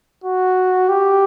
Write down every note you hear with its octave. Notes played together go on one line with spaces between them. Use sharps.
F#4
G4